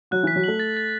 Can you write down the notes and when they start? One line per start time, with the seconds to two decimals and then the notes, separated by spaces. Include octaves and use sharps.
0.11 F#3 F#4 F#6
0.23 E3 E4 B6
0.36 F#3 F#4
0.44 A3 A4 F#7
0.60 A6
0.77 A6